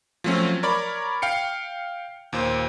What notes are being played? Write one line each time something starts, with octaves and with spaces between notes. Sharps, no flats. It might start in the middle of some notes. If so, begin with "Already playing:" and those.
F3 F#3 A3 C4 C#4
A#4 C#5 D5 B5
F5 G5 C#7
D#2 A#2 C5